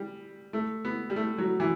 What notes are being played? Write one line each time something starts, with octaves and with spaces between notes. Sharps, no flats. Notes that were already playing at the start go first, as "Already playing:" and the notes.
Already playing: G3
A3
B3
G3
A3
F#3
E3